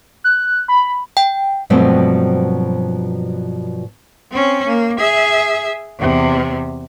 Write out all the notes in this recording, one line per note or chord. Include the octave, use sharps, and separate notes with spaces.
F#6
B5
G5
G2 B2 F3 F#3 A3 C4
C4 C#4
A#3
G#4 E5
E2 C3